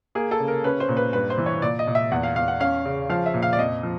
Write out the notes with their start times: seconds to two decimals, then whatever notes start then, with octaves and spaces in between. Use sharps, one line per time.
0.15 A#3 G#4
0.31 A4
0.40 C#3
0.48 A#4
0.64 C#4 B4
0.80 C5
0.89 A#2
0.97 B4
1.13 G2 B4
1.30 C5
1.38 E3
1.46 C#5
1.62 A#2 D5
1.79 D#5
1.87 A#2
1.95 E5
2.11 E2 F#5
2.23 F5
2.36 E2 F5
2.48 F#5
2.60 C#4 F5
2.85 C#3
3.09 F3 F5
3.26 E5
3.34 A#2
3.42 F5
3.53 D5
3.59 F2 D#5
3.83 F3